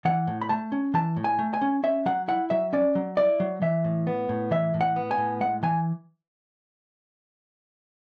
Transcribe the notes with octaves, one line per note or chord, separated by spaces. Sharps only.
E3 F#5
A2
B5
A3 A5
C#4
E3 A5
A2
G#5
A3
G#5
C#4
C#4 E5
F#3 F#5
E4 F#5
F#3 E5
C#4 D5
F#3
E4 D5
F#3
E3 E5
A2
B3
A2
E3 E5
A2
F#5
B3
G#5
A2
G#3 F#5
E3 G#5